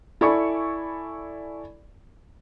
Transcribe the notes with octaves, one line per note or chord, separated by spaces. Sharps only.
E4 A4 D5 G#5 B5 C#6